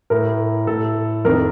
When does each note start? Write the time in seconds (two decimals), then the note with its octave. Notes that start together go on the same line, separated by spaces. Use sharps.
0.10 A2 A#4
0.67 A2 A4
1.25 F2 D#3 A#4